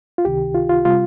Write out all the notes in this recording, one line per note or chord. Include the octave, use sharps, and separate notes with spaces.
F4
C#2 C3 D#3 G4
F4
F4
C3 G3 F4